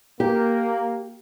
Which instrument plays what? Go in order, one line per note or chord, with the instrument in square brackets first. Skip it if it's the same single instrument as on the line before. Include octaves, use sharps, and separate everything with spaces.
[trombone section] A#3 [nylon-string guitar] G4